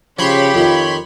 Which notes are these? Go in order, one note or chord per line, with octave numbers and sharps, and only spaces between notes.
C#3 F3 G4 C#5 B5 C6
F2 D#3 F4